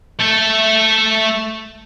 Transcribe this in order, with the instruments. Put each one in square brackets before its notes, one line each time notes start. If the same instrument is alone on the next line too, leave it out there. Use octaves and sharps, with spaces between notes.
[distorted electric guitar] A3 A4